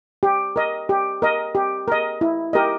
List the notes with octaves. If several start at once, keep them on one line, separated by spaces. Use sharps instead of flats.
G4
A#4 D#5
G4
A#4 D#5
G4
A#4 D#5
E4
G4 A#4 D#5